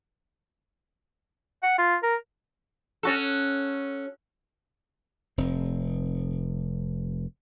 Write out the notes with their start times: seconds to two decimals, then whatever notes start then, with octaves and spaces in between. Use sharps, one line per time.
1.63 F#5
1.78 F4
2.03 A#4
3.03 C#4 F#4 A4
5.38 F1 C4